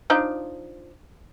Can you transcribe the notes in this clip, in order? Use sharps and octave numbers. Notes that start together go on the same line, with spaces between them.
F3 D4 D#4